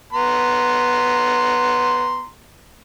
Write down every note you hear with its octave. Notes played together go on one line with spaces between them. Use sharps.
B3 A#5 C6